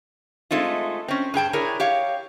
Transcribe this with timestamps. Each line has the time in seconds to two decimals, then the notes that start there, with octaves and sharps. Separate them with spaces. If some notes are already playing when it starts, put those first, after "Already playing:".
0.51 G#3 A3 C4 D#4 F4
1.08 C4 C#4
1.34 G2 G#4 G5 A5
1.53 D4 E4 G#4 A#4 C#5
1.80 G4 C#5 F5